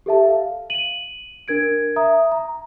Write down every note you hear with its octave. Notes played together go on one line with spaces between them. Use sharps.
G4 A4 E5 A5
F5
D#7 F#7
D4 A#4 G#6 D7
E5 A#5 D#6
A#5